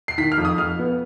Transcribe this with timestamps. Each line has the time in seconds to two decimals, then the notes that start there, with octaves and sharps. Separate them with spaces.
0.08 C7
0.18 D#3 B6
0.32 F6
0.38 F2
0.45 D#6
0.58 F2 F6
0.79 B3